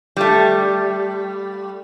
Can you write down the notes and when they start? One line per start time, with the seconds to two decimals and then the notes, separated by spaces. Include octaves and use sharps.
0.17 G3 A3